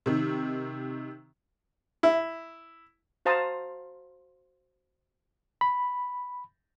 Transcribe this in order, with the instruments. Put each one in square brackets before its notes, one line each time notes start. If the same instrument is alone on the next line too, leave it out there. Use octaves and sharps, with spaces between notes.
[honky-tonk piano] C3 D#3
[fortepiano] E4
[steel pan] F#4 C5 F5 A5 A#5 D#6
[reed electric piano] B5